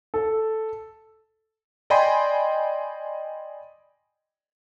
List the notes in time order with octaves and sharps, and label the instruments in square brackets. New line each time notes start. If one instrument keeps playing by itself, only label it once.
[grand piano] A4
[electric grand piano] D5 D#5 G5 G#5 B5 C6